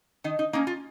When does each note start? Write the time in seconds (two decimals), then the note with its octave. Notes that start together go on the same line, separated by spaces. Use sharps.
0.24 D#3 D#4
0.39 D#4
0.53 A#3 C#4 D#4
0.67 F4